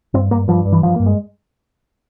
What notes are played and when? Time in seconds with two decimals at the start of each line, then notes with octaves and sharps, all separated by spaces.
0.14 G2 C4
0.31 G2 A#3
0.48 G2 F3
0.65 G2
0.72 E3
0.83 G2 F3
0.96 G2 A#3
1.06 G#3